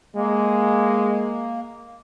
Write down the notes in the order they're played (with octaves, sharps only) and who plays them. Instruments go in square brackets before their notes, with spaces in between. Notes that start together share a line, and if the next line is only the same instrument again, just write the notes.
[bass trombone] G#3 [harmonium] A#3